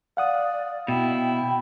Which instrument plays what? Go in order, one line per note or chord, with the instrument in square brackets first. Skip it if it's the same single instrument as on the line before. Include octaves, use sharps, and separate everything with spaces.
[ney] D5 [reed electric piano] F5 F#5 D#6
[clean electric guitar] B2 [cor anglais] E4 [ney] G5